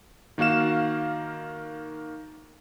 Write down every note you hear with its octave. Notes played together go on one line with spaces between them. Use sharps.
D#3 A#3 F#4 F5 E7